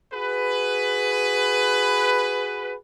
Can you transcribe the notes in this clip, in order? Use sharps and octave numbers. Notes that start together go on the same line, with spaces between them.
F#4 G#4 B4